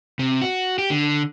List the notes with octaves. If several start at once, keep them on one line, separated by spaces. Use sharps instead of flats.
C3
F#4
G4
D3